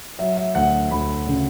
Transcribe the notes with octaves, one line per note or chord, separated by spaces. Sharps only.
F#3 E5
E5
D2 F#5
D2 B5
C#3